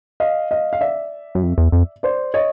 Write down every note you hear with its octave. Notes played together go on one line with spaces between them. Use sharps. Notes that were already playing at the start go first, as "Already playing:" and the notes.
D#5 F5
D#5 F5
F5
D5 E5
F#2
F2
E2
F2
C5 D5
C#5 D#5